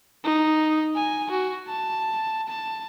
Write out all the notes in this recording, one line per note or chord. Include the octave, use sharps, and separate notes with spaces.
D#4
G#5
F#4
A5
A5